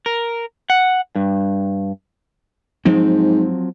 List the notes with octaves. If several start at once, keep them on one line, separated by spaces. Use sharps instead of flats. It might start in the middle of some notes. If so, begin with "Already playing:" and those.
A#4
F#5
G2
G#2 F3 F#3 C4